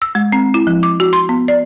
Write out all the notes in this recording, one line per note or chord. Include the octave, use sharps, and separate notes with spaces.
E6
G#3
C4
E4
F3
D6
F#4
C6
B3
D5